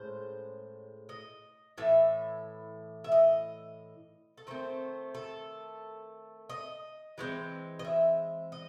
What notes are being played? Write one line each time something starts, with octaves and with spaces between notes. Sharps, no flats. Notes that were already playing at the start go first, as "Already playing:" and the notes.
Already playing: A2 G#3 C#4 C5
D#5
A2 E3 E5
E5
D#5
A4
D#3 A3 C4 C5
A4
D#5
E3 G#3 C4
D#5
E5
D#5